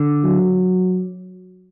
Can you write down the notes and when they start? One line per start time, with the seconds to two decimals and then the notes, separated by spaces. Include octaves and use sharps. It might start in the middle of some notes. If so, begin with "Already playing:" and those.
Already playing: D3
0.24 F#3